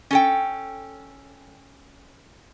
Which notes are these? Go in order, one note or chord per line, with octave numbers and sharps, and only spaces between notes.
C#4 A4 G5